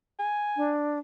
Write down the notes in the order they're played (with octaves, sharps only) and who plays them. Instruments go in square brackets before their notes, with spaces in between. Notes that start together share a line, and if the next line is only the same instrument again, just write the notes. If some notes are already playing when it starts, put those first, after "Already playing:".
[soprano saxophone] G#5
[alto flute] D4